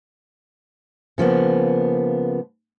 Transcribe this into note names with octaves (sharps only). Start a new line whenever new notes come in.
C#3 F3 A#3 B3